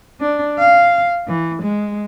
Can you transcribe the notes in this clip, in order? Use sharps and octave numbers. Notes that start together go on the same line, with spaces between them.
D4
F5
E3
G#3